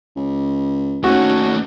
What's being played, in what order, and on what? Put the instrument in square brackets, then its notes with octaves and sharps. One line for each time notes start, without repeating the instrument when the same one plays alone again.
[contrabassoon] C#2
[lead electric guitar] D#2 A3 [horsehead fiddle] C#4 D#4 [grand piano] F#4